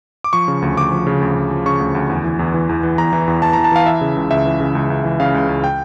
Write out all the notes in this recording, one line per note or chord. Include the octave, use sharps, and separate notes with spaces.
D6
F3 C#6
C#3
D2
D2 D6
F3
C#3
D2
D2
F3
C#3 C#6
D2
D2
E2
E3
E2
E3
E2
E3
E2 A#5
E3
E2
E3 A5
A#5
E2
A5
E3 F5
E3 E5
C#3
C#2
C#2 E5
E3
C#3
C#2
C#2
E3
C#3 F5
C#2
C#2
G5